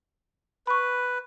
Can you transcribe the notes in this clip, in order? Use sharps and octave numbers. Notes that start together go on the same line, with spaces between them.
B4 B5 C#6